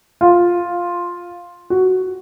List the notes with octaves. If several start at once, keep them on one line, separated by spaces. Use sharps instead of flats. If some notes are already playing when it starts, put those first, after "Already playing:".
F4
F#4